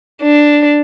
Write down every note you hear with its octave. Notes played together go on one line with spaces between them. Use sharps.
D4